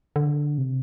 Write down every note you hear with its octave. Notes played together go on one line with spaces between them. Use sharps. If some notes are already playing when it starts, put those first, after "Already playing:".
D3
C3